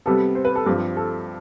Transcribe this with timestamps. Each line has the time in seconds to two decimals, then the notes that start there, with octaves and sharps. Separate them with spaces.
0.06 C3 G3 B3 A4
0.35 C5
0.45 B4
0.55 A4
0.66 G2 F3 C4 G4
0.97 A4